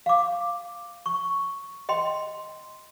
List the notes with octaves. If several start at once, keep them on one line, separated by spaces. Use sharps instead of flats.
F5 D6
C#6
D#5 G5 C6